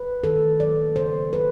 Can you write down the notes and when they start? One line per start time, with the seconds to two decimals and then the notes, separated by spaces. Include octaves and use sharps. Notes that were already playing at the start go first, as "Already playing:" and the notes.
Already playing: B4
0.24 D#3 A4
0.60 F#3 A#3 D5
0.96 C#3 C5
1.32 F#3 A#3 B4